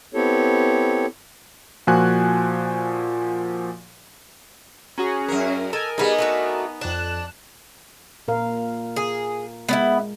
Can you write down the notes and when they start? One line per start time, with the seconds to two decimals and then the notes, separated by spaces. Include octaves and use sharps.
0.14 B3 C4 E4 G4 A4 C#5
1.87 A#2 F3 F#4 G#5 F#6
4.98 C#4 F#4 G#4 A#5
5.28 F#2 A#4
5.73 A4 A#4 D#5 G#5
5.98 G3 B3 D#4 G#4
6.18 A3 D4 F#4
6.81 F2 D4 F#6 E7
8.28 A#2 A#4 F5
8.96 G#4
9.69 G#3 B3 C#4 E4